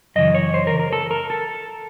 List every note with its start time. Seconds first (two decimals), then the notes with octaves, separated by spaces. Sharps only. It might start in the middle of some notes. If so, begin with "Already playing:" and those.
0.16 F#2 C#3 E3 D#5
0.34 C#5
0.54 C5
0.67 A#4
0.79 A#4
0.93 A4
1.11 A#4
1.30 A4